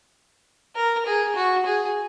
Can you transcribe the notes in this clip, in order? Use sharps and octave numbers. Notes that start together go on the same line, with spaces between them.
A#4
G#4
F#4
G#4